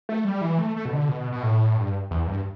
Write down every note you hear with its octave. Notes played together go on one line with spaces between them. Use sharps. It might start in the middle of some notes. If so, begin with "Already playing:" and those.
A3
G3
E3
A3
A3
B2
D3
B2
B2
A2
G2
E2
G2